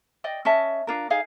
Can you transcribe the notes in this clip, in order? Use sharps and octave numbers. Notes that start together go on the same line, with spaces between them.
D5 D#5 G5
C#4 D#5 E5 A5
D4 F4 A#4
D#4 G#4 F5